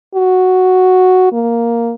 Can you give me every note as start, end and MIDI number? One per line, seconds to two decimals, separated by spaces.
0.15 1.30 66
1.32 1.93 58